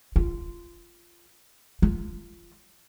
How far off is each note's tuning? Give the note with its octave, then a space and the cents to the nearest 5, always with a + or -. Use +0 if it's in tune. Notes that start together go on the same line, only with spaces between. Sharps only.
F4 -15
F4 -20